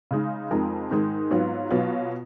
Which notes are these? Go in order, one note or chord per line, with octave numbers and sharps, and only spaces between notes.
C#3 G#3 D#4
F2 F3 G#3 D#4 A#4
G#2 D#3 G#3 D#4
G#2 F#3 B3 F4
B2 F#3 B3 F4